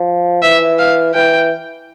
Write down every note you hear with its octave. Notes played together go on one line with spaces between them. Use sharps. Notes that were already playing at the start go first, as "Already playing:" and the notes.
Already playing: F3
E3 E5
F5
E3 G5